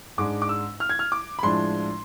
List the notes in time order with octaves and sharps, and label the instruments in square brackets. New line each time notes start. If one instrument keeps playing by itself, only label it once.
[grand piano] G#2 G#3 D4 D6
D6
E6
F6
G#6
F6
D6
B5
A2 F3 G#3 D4 C6